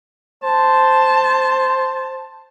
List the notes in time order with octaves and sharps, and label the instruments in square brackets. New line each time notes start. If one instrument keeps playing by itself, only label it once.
[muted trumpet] C5 [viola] A5